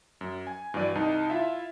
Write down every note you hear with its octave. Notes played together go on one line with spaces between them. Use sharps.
F#2
G#5
G2 E3 F#3 D5 D#7
C2 D#4 A5
E4 F4 E5